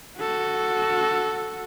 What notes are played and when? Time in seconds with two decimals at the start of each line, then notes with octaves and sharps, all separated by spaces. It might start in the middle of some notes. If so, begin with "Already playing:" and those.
0.18 F#4 A4